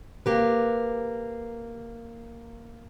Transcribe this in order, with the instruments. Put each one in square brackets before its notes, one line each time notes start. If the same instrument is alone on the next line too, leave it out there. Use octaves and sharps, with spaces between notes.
[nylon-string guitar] A#3 G4 B4